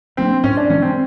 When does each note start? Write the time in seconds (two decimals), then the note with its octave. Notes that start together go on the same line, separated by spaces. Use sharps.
0.17 F#3 A#3 C4 D4
0.44 G#2 C#4
0.57 D4
0.69 E3 G#3 C4 C#4
0.82 C4